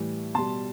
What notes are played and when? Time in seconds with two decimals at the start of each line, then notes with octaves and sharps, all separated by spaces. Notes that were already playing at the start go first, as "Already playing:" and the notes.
Already playing: A2 E3 G3
0.35 B2 G3 A5 C6